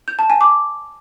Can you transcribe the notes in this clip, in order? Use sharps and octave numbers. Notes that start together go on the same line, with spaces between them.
G6
A5
G#5
D6